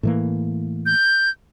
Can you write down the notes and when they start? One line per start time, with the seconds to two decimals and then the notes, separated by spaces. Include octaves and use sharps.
0.03 A2 E3 A#3
0.86 G6